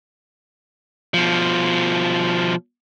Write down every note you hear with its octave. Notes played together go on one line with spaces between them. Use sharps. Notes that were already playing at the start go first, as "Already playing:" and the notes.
B2 F3